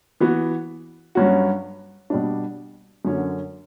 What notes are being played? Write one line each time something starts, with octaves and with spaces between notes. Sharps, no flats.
E3 B3 F#4
G2 F#3 C#4 F#4
B2 G3 D4
F#2 D3 F#3 C#4